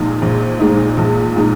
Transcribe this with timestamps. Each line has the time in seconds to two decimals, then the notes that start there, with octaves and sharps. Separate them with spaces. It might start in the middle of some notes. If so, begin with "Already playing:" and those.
Already playing: A#1 A#2 G#3 D#4
0.22 A#1
0.60 A#2 G#3 D#4
0.97 A#1
1.36 A#2 G#3 D#4